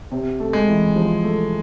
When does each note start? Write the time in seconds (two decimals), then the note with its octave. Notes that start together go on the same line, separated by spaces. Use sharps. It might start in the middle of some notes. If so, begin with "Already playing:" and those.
0.12 C3
0.40 A3
0.53 G#3
0.68 E3
0.96 F3
1.23 A3